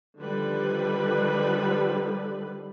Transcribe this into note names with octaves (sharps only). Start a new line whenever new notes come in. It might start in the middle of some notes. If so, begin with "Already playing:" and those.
D3 D#3 F3 G3 B4